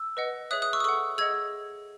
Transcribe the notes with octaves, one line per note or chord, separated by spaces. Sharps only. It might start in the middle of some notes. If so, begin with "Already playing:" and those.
Already playing: E6
B4 D#5 F#5
G#4 C#5 E5 D#6 F#6
D#6 F#6
C#6 E6
D#6
A4 C#5 F#5 C#6 E6
G#4 D#5 F#5 E6 G#6